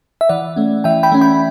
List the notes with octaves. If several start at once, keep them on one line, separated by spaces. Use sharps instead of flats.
E5
E3 D5 F#5
A3 C#4
E3 E5 G5
G5 B5
A3 C#4
G5 B5